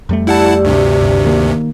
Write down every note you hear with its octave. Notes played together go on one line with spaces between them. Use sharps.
F2 G3 A3
E4 G4 D5 F#5 A5 E6
D2 G2 C3
G1
D#3 A#3